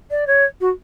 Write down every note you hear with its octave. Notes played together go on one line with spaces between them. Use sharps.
D5
C#5
F#4